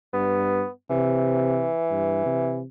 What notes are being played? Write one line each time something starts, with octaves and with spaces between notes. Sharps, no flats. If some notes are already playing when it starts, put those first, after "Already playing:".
G2 B3
C3 E3
G2
C3